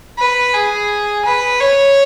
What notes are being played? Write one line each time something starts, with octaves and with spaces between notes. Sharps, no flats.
B4
G#4
B4
C#5